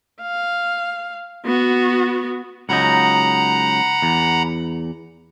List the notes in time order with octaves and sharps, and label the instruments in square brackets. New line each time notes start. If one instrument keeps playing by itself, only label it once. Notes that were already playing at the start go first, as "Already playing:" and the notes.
[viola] F5
B3 F#4
[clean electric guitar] C#2 F#3 D#4 [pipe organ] F#5 A#5 B5
[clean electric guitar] E2